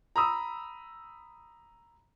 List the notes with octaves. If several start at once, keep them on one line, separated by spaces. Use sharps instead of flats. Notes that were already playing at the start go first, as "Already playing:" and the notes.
A#5 B5 D#6 E6